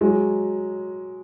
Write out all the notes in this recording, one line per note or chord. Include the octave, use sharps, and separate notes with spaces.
F#3 G#3